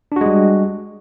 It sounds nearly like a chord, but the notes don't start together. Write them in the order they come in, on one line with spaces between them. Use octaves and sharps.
D4 F#4 G#3 G3